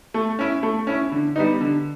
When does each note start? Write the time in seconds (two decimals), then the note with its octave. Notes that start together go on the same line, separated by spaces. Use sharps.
0.14 A3
0.39 C#4 E4
0.63 A3
0.87 C#4 E4
1.12 D3
1.36 G3 B3 D#4
1.61 D3